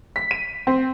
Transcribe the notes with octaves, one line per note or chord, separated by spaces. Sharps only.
B6
D#7
C4